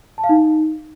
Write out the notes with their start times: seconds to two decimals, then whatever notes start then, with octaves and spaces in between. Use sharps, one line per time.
0.18 A5
0.24 F5
0.29 D#4